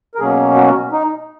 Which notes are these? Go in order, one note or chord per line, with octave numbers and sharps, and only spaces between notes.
A#4
B2 F#3 A#3 C#4 G#4
F#4
D#4